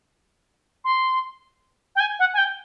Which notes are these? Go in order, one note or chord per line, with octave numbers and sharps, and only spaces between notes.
C6
G5
G#5
F#5
G#5
G5